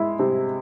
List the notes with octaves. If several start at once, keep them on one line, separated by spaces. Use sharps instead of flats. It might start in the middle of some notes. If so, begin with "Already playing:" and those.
Already playing: G#3 E4
C3